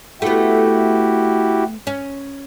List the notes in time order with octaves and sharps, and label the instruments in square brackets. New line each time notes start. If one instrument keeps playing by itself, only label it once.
[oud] A3 B3 [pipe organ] E4 F#4 G4
[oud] C#4